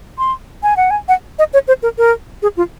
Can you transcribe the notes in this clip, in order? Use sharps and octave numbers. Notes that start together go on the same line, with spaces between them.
C6
G#5
F#5
G#5
F#5
D#5
C#5
C5
A#4
A#4
G#4
F4